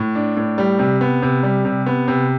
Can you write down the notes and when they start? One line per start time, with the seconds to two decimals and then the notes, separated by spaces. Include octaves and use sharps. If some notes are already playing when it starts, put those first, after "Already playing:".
Already playing: A2
0.15 D4
0.37 A2
0.58 G3
0.79 C3
1.01 B3
1.22 C3
1.43 G3
1.65 C3
1.86 B3
2.08 C3